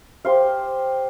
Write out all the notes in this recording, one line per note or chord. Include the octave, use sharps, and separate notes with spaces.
G4 C5 F5